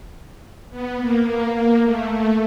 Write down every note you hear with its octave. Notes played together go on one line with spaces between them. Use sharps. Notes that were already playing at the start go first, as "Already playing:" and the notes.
B3
A#3
A#3
A#3
A3
A3